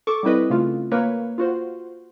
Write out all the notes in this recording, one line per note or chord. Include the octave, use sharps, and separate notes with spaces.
A4 C#6 D6
G3 C4 E4 B4 D#5
C#3 A3 F4
A#3 B4 C#5
F4 F#4 C5